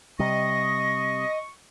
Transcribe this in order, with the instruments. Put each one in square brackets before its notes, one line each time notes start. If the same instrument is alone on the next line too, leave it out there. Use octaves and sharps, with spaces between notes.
[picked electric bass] C3 G3 [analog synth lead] D#5 [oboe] C#6 [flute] A#6